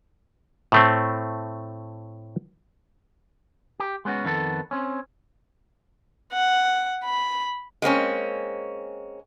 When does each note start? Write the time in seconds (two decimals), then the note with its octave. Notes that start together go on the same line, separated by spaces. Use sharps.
0.72 A2 A3 C4
3.80 G4
4.05 G#3 B3 C#4 E4 F#4
4.24 F2 D#3 B3 A4
4.71 C4 C#4
6.33 F#5
7.04 B5
7.82 G#3 A#3 C4 C#4